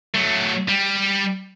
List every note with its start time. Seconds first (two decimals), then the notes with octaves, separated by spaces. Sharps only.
0.15 F#3 A3
0.68 G3